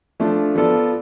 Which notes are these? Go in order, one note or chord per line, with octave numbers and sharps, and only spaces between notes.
F3 A3 D4 F4
F3 B3 F4 A4 D5